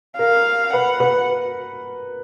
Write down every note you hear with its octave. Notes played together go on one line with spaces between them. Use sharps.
A#4 F5
B4 F#5
B4